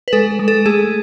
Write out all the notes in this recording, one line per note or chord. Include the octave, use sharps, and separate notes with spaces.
B4
G#3 A4
G#3
A4
A3 G#4